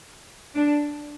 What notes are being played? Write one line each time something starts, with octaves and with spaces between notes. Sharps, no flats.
D4